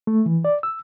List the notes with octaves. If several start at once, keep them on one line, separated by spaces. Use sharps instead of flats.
A3
E3
D5
E6